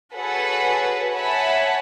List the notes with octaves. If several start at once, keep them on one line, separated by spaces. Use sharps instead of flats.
F#4 G#4 A4 B4 C#5 F#5
C#5 E5 F#5 G#5 A5 B5